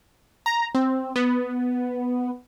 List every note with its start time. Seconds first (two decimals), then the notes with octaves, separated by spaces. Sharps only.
0.46 A#5
0.75 C4
1.16 B3